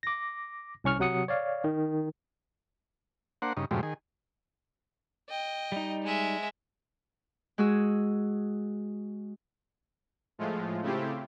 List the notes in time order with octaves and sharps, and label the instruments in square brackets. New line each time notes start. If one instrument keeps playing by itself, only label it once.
[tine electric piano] D6 A#6
C2 C#4 C#6 F6
C3 F#3 F#5 D#6 C#7
C#5 D5 F5
D#3
[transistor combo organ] A#3 D4 C5 F#5
G2 C#3 D#4
F#2 A2 C3 F3 G3 G#3
D#3 G#4
[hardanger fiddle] D#5 G5
[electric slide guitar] G3 D#4
[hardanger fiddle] G#3 E5
[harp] G#3 F#4 G#4 E6
[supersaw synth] A2 F3 G#3 A3 F4
C#3 A3 C4 E4 F4 G4